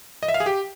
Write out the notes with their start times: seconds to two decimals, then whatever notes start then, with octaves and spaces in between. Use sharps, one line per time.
0.23 D#5
0.28 E5
0.34 F5
0.40 G#4
0.46 G4